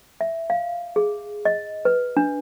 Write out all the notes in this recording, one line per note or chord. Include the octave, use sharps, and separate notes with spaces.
E5
F5
G#4
D#5
B4
D4